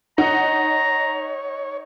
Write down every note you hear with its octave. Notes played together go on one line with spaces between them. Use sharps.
D#4 C#5 F#5 A#5